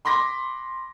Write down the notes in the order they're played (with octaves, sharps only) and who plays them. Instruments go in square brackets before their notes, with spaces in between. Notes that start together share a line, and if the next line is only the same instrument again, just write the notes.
[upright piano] B5 C6 D6 A#6 B6